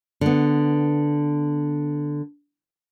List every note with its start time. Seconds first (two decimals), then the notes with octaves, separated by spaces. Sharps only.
0.21 D3 B3